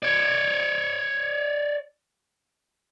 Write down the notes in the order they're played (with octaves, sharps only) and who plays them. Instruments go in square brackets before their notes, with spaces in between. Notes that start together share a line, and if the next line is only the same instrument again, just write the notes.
[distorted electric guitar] C#5 D5